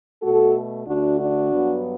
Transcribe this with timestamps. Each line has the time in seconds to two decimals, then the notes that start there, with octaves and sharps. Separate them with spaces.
0.22 B2 A3 F#4 A4
0.87 D2 D3 A3 D4 F#4
1.20 D4 F#4
1.53 G2 F#3 B3